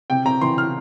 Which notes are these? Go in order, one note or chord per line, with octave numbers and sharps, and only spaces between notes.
C3 G5
C3 A#5
E3 C6
F6